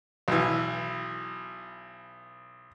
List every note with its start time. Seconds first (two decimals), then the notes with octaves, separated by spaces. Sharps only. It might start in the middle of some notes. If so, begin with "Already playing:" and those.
0.28 B1 E3